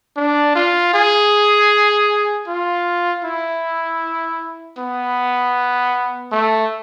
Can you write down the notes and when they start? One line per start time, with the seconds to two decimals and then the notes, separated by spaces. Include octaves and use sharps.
0.16 D4
0.55 F4
0.94 G#4
2.47 F4
3.24 E4
4.78 B3
6.32 A3